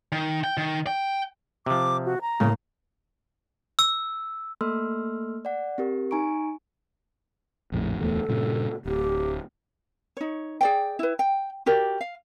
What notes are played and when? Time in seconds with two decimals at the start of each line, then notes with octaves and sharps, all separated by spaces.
0.12 D#3
0.44 G5
0.57 D#3
0.87 G5
1.66 C3 F3 D6
2.06 F#4
2.21 A#5
2.40 A2 C#3 A#3
3.79 E6
4.61 A3 A#3 A4 C6 E6 F6
5.45 D5 F#5
5.78 C4 G4 A#4
6.11 D#4 G#5 A#5 C#6 D7
7.72 A#1 F2 A2
7.98 D1 E2 A3 A4
8.29 G2 A#2 C#3
8.85 D1 G4
10.17 D#4 C#5
10.61 G#4 D5 G5
10.99 E4 B4
11.19 G5
11.66 F#4 G4 A#4 D5
12.01 F5